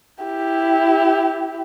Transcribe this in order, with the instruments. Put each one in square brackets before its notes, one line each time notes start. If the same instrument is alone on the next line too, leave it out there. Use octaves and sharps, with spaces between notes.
[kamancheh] E4 G4